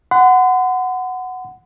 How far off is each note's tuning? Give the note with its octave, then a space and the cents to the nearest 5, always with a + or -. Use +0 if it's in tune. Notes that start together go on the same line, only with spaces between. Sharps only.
F#5 +0 C6 -45